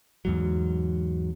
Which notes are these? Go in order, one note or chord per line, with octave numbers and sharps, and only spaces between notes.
E2 G#2 F#3